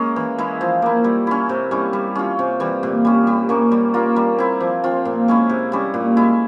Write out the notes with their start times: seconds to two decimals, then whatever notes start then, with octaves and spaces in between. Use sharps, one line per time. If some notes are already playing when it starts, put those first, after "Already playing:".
Already playing: G#3 A#3 C#4
0.16 E3
0.38 G#3 E4
0.61 F3
0.82 A#3 E4
1.04 G3
1.27 C#4 E4
1.49 C3
1.71 G3 C#4 E4
1.93 G3
2.15 C#4 F4
2.39 C3
2.60 E3 G3
2.83 A#2
3.05 G3 C#4
3.27 G3
3.49 A#3 C#4
3.72 G3
3.94 A#3 F4
4.16 G3
4.38 C4 E4
4.60 F3
4.84 C4 F4
5.05 A#2
5.28 G#3 C#4 E4
5.49 C3
5.72 G3 C#4 E4
5.94 A#2
6.17 G#3 E4